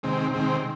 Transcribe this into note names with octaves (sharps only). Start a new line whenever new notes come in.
C3 D#3 G#3 C4
C3 D#3 G#3 C4